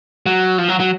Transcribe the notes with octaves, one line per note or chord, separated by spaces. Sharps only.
F#3
F3
F#3
F#3